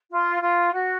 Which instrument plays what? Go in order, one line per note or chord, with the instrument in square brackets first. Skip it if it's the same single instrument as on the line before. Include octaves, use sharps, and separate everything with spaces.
[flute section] F4
F4
F#4